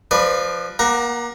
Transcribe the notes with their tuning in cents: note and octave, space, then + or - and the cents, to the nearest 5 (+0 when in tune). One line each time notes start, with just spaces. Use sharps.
F3 +0 B4 +0 D5 +30
A#3 +30 F#5 +15 A#5 +0